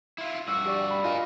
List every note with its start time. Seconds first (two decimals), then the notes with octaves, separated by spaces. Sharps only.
0.18 E4 F4
0.48 G2 F#4 E6
0.66 G4 D5 C#6
0.91 B5
1.04 F4 A#4 D#5 F5 G#5